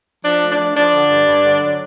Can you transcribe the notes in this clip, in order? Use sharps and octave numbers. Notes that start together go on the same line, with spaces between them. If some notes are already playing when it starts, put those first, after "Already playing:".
F3 D4
A3
D4
F3
F3 D4
D3
G2
G2
D3
F#3